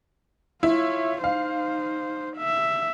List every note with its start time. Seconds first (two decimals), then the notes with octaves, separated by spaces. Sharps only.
0.63 E4 F4 C#5
1.24 D#4 C5 F5
2.37 E5